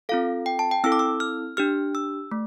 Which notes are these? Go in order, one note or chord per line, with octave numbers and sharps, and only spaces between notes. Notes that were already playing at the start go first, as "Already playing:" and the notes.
C4 F4 A4 F5
G5
A5
G5
C4 E4 A4 E6
D6
E6
F6
D4 G4 F6
E6
A3